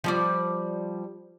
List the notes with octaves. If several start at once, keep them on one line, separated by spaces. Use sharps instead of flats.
F3 G3 D5